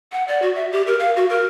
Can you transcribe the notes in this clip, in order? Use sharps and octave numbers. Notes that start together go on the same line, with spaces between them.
F#5
D5
F#4
E5
G4
A#4
F5
F#4
A#4